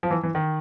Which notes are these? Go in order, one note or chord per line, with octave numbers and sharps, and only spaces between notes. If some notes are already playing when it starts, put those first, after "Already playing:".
F3
E3
E3
D#3